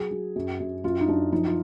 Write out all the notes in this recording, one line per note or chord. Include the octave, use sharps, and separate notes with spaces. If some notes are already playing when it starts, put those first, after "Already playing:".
Already playing: F#3 G#4
F#3
F#2
F#2
F#2 F4
D#4
F#2 D4
F3 D#4
F4